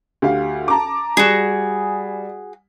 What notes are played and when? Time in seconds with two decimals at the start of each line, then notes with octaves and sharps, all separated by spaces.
0.22 D2 G4 F5
0.68 A5 A#5 D6
1.17 G3 F#4 G#4